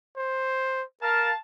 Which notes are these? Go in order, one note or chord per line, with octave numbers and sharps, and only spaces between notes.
C5
A#4 F5 A5